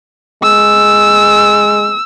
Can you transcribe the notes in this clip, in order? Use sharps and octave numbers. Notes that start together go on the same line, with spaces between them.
G#3 E6